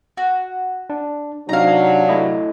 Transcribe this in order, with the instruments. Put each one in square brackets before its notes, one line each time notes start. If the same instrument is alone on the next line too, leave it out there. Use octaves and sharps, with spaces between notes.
[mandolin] F#4
[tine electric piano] D4
[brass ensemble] C3 F#3 [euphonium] D4 [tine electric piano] D#4 [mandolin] F5 A#5
[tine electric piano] A3 E4 D#5